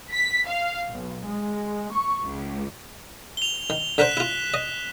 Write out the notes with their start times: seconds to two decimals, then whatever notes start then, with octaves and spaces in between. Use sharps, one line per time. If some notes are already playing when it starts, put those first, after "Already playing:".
0.12 B6
0.47 F5
0.88 B1
1.26 G#3
1.92 C#6
2.24 C#2
3.37 F7 G7
3.70 D#3
3.98 D3 A#4 C5 F#6 B6 E7
4.17 E4 F4
4.54 D#5